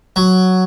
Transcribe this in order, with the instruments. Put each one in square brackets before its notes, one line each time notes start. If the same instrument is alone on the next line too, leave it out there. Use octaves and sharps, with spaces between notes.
[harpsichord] F#3